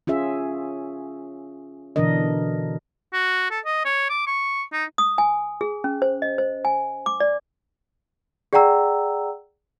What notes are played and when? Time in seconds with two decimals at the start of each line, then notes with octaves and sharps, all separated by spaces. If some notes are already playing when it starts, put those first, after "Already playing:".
0.07 C#4 F4 G#4 E5
1.96 B2 D3 E3 D4 A#4 D#5
3.13 F#4
3.50 A4
3.65 D#5
3.85 C#5
4.10 D6
4.27 C#6
4.73 D#4
4.98 D#6
5.18 G#5
5.61 G#4
5.84 C#4
6.02 C5
6.22 D#5
6.38 C5
6.65 G#5
7.06 D6
7.20 D5
8.53 G#4 D5 F#5 G5 A#5 E6